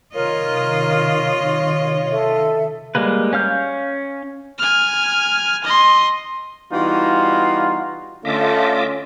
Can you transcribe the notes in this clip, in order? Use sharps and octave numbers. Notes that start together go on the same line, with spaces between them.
C3 D#3 F4 A#4 C#5 D#5
A4 E5
G3 G#3 A#3 B4
C#4 F5 F6 G6
G#5 F6
D#5 C6
E3 G3 B3 D#4 F4 F#4
D3 A3 C#4 F4 D#5 E5 D6